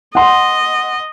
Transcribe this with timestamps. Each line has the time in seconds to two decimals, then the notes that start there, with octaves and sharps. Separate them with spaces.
0.15 D#5 F#5 C6